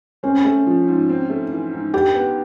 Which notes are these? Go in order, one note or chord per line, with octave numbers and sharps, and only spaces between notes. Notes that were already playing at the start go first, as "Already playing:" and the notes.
C4 C#4
A3
F3
G#2
C4
A3
E3
G#2
D4 G4
B3